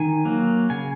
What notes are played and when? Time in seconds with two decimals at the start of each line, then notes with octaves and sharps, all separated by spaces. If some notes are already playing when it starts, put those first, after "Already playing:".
Already playing: D#3 G#5
0.25 F#3 A#3
0.70 C#3 G#5